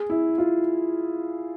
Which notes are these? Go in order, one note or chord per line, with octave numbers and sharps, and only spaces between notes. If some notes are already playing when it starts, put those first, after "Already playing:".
Already playing: G#4
E4
F4